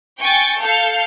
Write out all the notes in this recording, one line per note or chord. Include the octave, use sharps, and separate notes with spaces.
G5 G#5 C#6 A6
A4 F5 G6 C#7